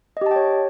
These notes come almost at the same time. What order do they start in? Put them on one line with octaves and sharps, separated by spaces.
D#5 G4 A5 G5 C#5